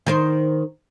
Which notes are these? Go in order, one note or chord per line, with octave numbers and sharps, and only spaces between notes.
D#3 A#4 C5